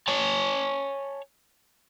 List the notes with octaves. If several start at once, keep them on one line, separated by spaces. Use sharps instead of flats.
C#5 G#5 A5